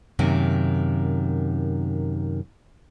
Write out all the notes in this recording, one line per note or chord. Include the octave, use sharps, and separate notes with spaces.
F#2 C3 D#3 A#3